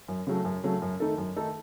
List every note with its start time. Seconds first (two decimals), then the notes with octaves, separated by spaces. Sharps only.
0.08 F#2
0.27 C#3 F#3 A3
0.45 F#2
0.64 C#3 F#3 A3
0.82 F#2
1.00 D#3 A3 D#4 A4
1.18 F#2
1.36 D#3 A3 D#4 A4